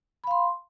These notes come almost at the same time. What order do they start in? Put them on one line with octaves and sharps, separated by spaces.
B5 F5 C6